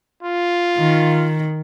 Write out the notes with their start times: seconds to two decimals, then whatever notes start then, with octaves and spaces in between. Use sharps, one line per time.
0.23 F4
0.78 D#3